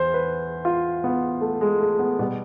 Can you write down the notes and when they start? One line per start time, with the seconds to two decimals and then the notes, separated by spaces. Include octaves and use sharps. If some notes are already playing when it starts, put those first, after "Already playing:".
Already playing: E2 C5
0.14 B4
0.65 F4
1.04 B3
1.41 A3
1.61 G#3
1.80 A3
1.99 B3
2.19 B2 G3 B3